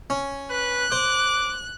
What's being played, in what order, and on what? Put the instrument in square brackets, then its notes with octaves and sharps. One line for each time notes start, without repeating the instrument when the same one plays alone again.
[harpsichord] C#4
[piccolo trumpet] B4 [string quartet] F#6
[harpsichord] C5 [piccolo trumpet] D6